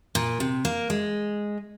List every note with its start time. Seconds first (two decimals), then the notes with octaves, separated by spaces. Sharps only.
0.15 A#2
0.40 C3
0.65 A#3
0.90 G#3